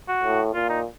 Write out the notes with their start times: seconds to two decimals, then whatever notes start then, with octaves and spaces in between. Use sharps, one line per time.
0.08 F#4
0.23 A2
0.54 A#2 F4
0.69 D#4